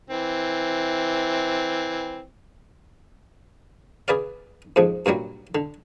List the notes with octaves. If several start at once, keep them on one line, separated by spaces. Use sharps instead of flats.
E3 C4
G#4 B4 D5 F5
F2 G#2 F3
G2 A#2 F#3 G3
D3